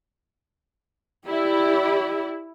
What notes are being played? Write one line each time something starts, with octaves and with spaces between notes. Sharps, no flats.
E4 G4 D5